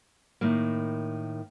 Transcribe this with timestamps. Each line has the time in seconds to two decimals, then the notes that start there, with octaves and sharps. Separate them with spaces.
0.41 A2 D#3 A#3